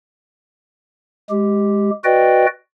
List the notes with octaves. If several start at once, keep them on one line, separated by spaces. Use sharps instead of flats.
G#3 G4
F#4 B4 D5 D#5 G5